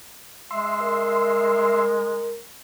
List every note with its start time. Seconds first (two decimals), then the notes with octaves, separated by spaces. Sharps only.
0.51 G#3 E5 C6
0.82 A#4